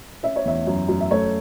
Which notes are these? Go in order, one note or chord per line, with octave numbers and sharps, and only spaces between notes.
C#4 E5
C#5
E2 E5
F#2
F#2
E5
A3 C#5